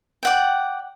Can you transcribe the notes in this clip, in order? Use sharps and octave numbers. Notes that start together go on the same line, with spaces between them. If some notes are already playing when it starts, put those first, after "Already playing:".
D5 F#5 G5